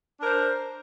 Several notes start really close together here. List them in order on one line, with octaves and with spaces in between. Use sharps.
D4 A#4 C5